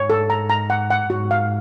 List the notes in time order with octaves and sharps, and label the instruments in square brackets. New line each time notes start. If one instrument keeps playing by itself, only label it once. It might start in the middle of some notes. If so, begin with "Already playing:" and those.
Already playing: [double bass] G#2 [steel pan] C#5
[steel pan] A4
A#5
A#5
F#5
F#5
[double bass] G#2 [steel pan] F#4
[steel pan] F5